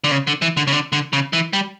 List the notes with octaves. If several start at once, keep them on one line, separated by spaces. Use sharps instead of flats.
D3
C#3
D3
E3
D3
C#3
D3
D3
C#3
E3
G3